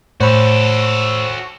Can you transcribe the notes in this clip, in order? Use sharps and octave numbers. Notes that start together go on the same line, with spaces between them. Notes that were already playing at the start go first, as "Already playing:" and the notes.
A2 F#4 A4 C5 C#5 B5